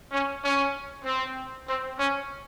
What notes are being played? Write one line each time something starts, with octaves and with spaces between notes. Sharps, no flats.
C#4
C#4
C4
C4
C#4